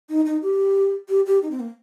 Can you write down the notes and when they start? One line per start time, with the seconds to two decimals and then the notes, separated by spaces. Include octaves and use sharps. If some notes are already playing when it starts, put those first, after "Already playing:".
0.09 D#4
0.26 D#4
0.42 G4
1.09 G4
1.26 G4
1.43 D#4
1.51 C4
1.60 A#3